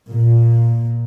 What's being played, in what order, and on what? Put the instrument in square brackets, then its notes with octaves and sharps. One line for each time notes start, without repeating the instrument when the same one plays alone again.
[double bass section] A#2